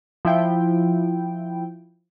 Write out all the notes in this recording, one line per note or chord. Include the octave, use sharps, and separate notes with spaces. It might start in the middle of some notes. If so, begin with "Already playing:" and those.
F3 E4 G5